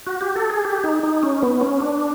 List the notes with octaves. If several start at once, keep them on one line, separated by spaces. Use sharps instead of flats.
F#4
G4
A4
G#4
G4
D#4
D#4
C#4
B3
C#4
D4